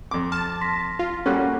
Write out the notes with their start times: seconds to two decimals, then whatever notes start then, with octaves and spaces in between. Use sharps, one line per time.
0.11 F2 D6
0.32 A5 F6
0.61 C6 A#6 B6
0.99 F4
1.26 G3 A#3 C#4 F#4 A4 F#5 F#6